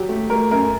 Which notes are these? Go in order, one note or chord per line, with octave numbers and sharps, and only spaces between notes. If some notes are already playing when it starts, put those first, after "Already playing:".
Already playing: F#3 G4
A3
A3 A#4
F#2 A#4